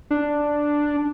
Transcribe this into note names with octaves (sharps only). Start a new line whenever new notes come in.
D4